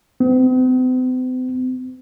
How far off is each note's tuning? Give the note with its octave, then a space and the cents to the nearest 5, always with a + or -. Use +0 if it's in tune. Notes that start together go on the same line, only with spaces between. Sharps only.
C4 -45